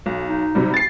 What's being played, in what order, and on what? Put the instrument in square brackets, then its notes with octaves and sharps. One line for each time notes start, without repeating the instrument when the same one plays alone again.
[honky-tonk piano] B1
[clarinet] D#4
[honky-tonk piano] C3 F#3 G3
A6 C7